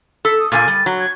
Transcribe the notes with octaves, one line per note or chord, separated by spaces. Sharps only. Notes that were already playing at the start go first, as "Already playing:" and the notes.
A4 B6
D#6
A#2 A#3 G#5 A6
G3
F#3
G#6